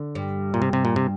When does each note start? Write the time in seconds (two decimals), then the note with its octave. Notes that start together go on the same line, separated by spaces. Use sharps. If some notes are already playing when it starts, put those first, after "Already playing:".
Already playing: D3
0.15 G2
0.54 A#2
0.62 C3
0.73 C3
0.85 A#2
0.96 C3